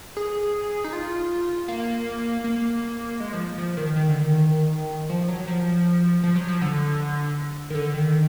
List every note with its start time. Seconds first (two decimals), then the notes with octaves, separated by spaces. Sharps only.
0.17 G#4
0.84 D#4
0.93 F4
1.68 A#3
2.44 A#3
3.20 G#3
3.33 F3
3.58 F3
3.77 D#3
3.96 D#3
4.09 D3
4.21 D#3
5.10 F3
5.28 F#3
5.47 F3
6.23 F3
6.36 F#3
6.48 F3
6.62 D3
7.70 D#3
7.75 D3
7.94 D#3